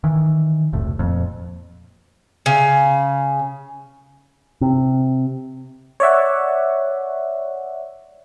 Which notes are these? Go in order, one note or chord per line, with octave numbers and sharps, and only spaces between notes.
D#3 E3
E1 C2 A2
F2 A#2
C#3
C3
C#5 D5 E5 F#5